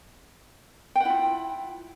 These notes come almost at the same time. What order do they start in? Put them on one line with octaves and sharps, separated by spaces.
G5 F#5 E4 F4